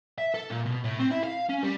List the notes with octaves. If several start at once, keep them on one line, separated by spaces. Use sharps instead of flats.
E5
A4
A#2
B2
A2
C4
E4
F5
C#4
G3